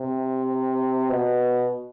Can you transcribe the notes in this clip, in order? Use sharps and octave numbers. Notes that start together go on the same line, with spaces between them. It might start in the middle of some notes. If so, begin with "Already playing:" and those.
Already playing: C3
B2